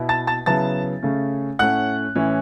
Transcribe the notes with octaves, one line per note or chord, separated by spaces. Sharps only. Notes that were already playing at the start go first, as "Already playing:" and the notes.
Already playing: B2 B3 E4
A5 A6
A5 A6
C#3 F#3 B3 E4 A5 A6
C#3 A3 C#4
A2 A3 C#4 F#5 F#6
A2 E3 C#4 E4